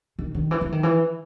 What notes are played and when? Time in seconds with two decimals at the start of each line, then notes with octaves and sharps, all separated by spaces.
0.19 D#3
0.34 D#3
0.51 E3
0.61 E3
0.72 D#3
0.83 E3